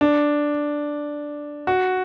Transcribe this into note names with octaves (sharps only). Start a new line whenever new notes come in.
D4
F#4